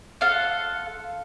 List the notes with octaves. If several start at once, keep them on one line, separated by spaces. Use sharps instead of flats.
F4 A4 F5 F#5